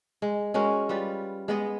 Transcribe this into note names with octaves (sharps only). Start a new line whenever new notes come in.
G#3
G#3 C#4 F#4 A#4
G3 F4 B4
G#3 B3 D#5